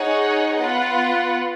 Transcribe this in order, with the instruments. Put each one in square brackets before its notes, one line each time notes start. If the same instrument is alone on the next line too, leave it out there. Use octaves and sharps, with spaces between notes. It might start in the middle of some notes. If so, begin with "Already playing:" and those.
Already playing: [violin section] D#4 G#4 C#5 F#5
B3 F4 B4 F#5